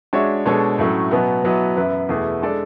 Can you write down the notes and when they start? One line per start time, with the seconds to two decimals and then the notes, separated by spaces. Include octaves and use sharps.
0.13 G#3 D4 F#4 C#5 E5
0.46 B2 G#3 D4 A4 C#5
0.79 A2 F#3 A3 C#4
1.11 B2 F#3 B3
1.43 B2 F#3 B3 E4 B4
1.76 F#2 E3 B3 E4 B4
2.09 E2 B2 A3 E4 G#4
2.42 G#3 D4 A4 D5